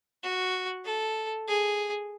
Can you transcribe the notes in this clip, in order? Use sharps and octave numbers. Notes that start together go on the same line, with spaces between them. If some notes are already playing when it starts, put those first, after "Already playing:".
F#4
A4
G#4